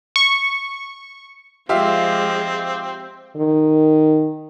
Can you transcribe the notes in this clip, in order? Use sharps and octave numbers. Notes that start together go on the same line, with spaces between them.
C#6
F3 G#3 C4 F4 G4 E5 F5
D#3